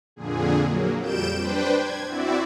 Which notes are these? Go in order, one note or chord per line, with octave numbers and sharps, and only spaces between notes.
F2 A#2 D3 G#4
F#3 A#3
F2 G3 G6 D7 E7
D4 B4 C5 G5
G#6
C4 E4 F#4 D5 E5